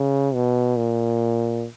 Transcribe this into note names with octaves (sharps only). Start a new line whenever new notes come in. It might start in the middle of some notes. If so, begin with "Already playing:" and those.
Already playing: C#3
B2
A#2